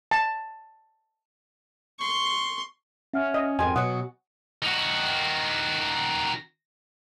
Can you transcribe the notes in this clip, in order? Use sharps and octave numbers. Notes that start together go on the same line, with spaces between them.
A5
C6 C#6
C#4 E5 F#5 F6
D#5
F2 G#2 D#3 F#4 G#5 C6
B2 F#3 B3 F#4 F#5 D#6
D#3 F#4